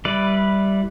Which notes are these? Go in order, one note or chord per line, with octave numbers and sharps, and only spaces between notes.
G3 E4 B4 D5